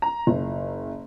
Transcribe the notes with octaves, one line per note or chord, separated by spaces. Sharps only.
A#5
F#1